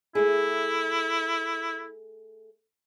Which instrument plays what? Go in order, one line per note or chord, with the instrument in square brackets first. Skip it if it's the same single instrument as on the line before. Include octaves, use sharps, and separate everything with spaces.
[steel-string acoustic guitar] A3 G#4 [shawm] E4